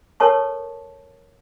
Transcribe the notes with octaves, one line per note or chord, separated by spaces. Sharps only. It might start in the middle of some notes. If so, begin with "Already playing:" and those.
A4 A#4 C#5 A5 C#6